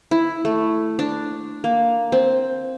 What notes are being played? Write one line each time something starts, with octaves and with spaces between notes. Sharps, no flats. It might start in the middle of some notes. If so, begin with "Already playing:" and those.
E4
A3
D4
A#3
C4